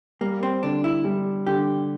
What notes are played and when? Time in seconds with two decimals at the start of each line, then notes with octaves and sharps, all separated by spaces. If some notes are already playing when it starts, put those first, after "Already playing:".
0.21 G3 A#3
0.43 C4
0.63 D3 D4
0.84 E4
1.04 G3
1.47 D3 G4